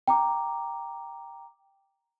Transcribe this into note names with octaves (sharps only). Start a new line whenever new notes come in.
G5 A#5 D6